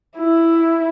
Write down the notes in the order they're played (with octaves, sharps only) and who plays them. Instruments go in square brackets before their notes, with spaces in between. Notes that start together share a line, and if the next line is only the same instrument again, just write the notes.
[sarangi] E4